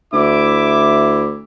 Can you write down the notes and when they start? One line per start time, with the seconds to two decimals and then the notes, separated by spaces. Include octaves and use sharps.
0.13 D2 E4 E5 D6